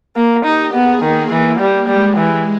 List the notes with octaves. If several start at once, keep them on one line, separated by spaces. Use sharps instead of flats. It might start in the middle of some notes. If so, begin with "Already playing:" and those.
A#3
D#4 G4
B3 G#4
D#3 A#3
E3
G3
G3 G#3
E3